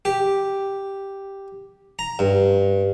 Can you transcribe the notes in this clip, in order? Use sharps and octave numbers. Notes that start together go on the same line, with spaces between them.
G4
A#5
G2